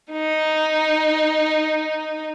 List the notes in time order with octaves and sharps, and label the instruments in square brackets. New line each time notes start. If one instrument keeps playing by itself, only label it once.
[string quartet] D#4